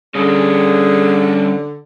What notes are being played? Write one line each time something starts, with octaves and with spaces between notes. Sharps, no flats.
D3 G3 C#4 G#4